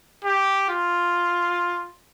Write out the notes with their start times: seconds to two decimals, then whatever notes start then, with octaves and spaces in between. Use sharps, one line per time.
0.24 G4
0.69 F4